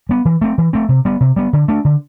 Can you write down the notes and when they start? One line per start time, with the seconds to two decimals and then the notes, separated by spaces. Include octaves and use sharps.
0.09 G3 B3
0.25 E3
0.41 A3 C4
0.58 E3
0.73 A3 C4
0.89 C3
1.05 G3 B3
1.21 C3
1.36 G3 B3
1.53 D3
1.68 A3 D4
1.85 D3